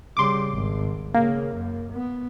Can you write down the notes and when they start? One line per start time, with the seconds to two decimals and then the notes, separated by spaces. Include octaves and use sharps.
0.17 C#3 G3 C6 D6
0.50 G#1
1.14 C#3 A#3
1.54 F#2
1.92 B3